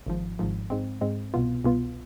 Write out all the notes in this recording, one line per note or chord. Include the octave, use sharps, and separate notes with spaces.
G#1 G#2 F3
G#1 G#2 F3
G#2 G#3 C4
G#2 G#3 C4
C2 B2 B3 F4
C2 B2 B3 F4